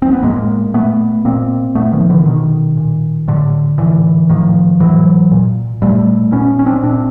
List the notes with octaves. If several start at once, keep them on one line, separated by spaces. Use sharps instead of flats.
C4
B3
A2 G#3 A#3
A#2 A3 B3
A#2 A#3 C4
A#2 A3 B3
D#3 F3
D3 E3
B2 D#3
A#2
A2 D3
A2 D3 E3
A2 D#3 F3
A2 E3 F#3
A#2
A#2 G3 A3
A#2 B3 C#4
C#4
C4 D4
A#2 C4 D4